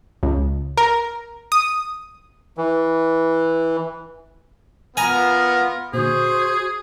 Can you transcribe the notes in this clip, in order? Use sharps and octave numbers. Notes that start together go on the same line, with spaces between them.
C#2
A#4
D#6
E3
B3 F4 A#4 G#5 A#5
A#2 D3 F#4 G#4 C5